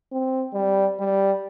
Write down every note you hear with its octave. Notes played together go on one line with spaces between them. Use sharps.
C4
G3
G3